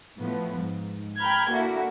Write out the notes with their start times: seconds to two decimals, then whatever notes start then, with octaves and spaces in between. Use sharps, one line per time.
0.20 A2 F3 B3
0.57 G#2
1.20 G5 A#5 B5 F6 G6 G#6
1.51 D3 A#3 E4 F#4